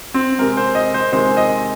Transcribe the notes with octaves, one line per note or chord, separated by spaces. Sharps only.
C4
C3 G#3 A#4
C5
D#5
C5
C3 D#3 G#3 C5
D#5